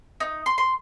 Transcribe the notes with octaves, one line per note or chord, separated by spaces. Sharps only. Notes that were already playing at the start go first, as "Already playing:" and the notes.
D#4
C6
C6